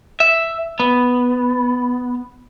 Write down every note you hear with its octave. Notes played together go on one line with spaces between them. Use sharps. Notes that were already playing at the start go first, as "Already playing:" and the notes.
E5
B3